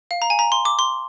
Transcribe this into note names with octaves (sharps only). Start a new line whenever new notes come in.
F5
A#5
G#5
A#5
C6
D6
C6